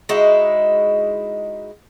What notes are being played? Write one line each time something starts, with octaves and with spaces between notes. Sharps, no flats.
G#3 D#4 E4 F#4